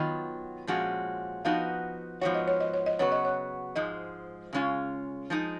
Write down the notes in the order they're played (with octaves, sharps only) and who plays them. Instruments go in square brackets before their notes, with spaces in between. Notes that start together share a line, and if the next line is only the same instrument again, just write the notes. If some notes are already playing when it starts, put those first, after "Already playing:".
Already playing: [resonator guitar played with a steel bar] D#3 F#3 B3 F4 [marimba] D#5
[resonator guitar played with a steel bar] A#2 F3 G#3 C#4 F#4
[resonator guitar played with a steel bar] F3 B3 D#4 F#4 [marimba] F5
[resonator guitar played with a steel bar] G#2 F3 B3 F#4 [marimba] C#5
[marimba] D#5
C#5
D#5
C#5
D#5
[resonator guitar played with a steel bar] C#3 F#3 B3 F#4 [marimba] C#5
[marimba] D#5
C#5
[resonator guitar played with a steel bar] G#2 F3 G#3 [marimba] D#5
[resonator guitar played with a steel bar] C#3 G#3 C#4 F4
F3 G#3 D#4